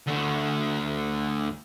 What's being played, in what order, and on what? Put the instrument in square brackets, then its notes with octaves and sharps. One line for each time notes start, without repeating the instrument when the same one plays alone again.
[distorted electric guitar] D2 D3